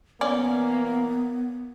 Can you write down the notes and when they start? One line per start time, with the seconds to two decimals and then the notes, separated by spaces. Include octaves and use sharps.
0.21 B2 E3 A#3 B3 C#4 D5